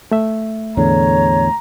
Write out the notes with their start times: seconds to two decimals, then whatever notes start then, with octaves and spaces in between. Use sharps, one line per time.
0.11 A3 E5
0.77 E2 A2 D3 C#5 A#5